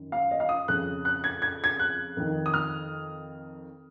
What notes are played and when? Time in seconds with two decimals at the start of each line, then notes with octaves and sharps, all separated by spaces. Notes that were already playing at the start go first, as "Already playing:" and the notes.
Already playing: F#2 D#3
0.12 F5
0.31 D#5
0.40 F5
0.49 D#6
0.68 F2 C#3 F#6
1.05 F#6
1.24 G#6
1.42 G#6
1.64 G#6
1.80 F#6
2.17 F2 D#3
2.46 D#6
2.54 F6